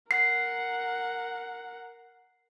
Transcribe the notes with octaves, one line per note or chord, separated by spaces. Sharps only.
A#4 F#5 C7